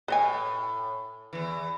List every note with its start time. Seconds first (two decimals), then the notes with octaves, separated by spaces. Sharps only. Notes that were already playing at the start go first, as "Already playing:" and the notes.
0.08 A2 B4 D#5 G#5
1.33 E2 E3